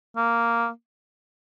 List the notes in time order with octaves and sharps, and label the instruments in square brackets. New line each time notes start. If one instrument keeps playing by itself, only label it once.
[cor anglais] A#3